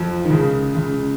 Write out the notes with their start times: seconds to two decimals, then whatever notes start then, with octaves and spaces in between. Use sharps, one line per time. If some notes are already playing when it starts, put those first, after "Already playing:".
Already playing: F2 F3
0.24 D#3
0.30 C#2 C#3
0.74 C#2 C#3